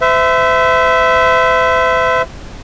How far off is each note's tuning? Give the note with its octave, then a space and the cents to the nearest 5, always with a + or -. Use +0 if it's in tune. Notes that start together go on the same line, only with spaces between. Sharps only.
C5 -45 E5 +0